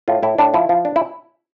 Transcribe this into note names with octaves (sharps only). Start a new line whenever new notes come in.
A2 F4
A2 E4
A2 D4
F3 E4
F3
D4
E4